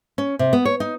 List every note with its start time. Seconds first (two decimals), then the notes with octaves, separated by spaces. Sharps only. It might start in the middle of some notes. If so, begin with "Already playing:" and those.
0.18 C#4
0.39 C3
0.53 B3
0.65 C#5
0.80 D#4